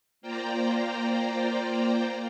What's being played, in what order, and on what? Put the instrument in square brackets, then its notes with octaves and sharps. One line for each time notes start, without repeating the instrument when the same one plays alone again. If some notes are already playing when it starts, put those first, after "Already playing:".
[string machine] A#3 F4 C5 D5 G5 A#5